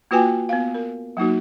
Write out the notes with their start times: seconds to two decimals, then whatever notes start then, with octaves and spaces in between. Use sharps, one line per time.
0.11 A#3 F4 F#4 B4 G5 G#5
0.49 B3 F5
0.74 A#4
1.17 F#3 A#3 D#4 F#4